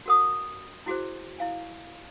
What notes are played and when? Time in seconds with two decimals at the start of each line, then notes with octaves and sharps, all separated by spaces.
0.06 F#4 G4 A#4 F#5 D#6
0.86 E4 F#4 G#4 C5
1.39 E4 F5 G#5